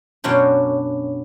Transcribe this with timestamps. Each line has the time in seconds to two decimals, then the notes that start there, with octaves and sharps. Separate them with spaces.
0.24 F#2 B2 C#4 D4 C5